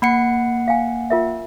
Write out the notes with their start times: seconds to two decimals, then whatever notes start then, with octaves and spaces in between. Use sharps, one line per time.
0.02 A#3 F#5 B5 C#7
0.68 F5 G#5
1.10 F4 A#4 E5